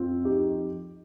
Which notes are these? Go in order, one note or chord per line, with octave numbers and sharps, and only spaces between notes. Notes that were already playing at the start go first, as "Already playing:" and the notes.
Already playing: F2 C4 F4
D#4 G4